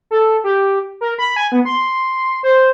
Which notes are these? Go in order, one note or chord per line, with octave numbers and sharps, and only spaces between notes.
A4
G4
A#4
B5
G#5
B3
C6
C5